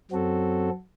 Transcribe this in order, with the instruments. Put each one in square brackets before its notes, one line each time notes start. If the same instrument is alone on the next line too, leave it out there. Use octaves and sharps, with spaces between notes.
[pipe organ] F#2 F#3 C4 F#4 A4